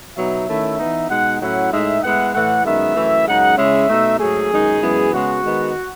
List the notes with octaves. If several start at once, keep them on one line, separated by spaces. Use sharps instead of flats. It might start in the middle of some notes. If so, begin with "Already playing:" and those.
B2 F#3 B3 D#4 E5
D#3 A3 C#4 E4
E3 B3 D#4
B2 G#3 D#4 F#5
A2 F#3 C#4 E4 F#5
A2 G#3 D#4 E5
A2 G#3 B3 E4 F#5
A2 E3 A3 F#5
F#2 D#3 G#3 B3 E5
F#2 E3 A3 E4
F#2 C#3 G#3 D#4 F#5
C#3 G#3 C#4 E4 E5
B2 A3 D#4
G#2 F#3 A3 G#4
F#2 D#3 G#3 D#4
F#2 E3 G#3 B3 E4
C#3 G#3 B3 F#4
D#3 G#3 B3 D#4